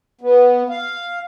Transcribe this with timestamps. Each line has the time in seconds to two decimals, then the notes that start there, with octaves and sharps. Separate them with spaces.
0.21 B3
0.70 F5